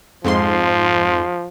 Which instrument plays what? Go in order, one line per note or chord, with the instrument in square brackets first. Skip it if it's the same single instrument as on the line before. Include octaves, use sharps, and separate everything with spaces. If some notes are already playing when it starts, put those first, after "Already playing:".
[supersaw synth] F2 G#2 C6 [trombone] F3